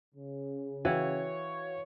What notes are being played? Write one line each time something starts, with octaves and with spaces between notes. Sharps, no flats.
C#3
E3 F#4 C#5 F5 G5